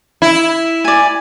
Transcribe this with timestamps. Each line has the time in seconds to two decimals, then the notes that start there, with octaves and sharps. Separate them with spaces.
0.22 E4
0.85 D5 G#5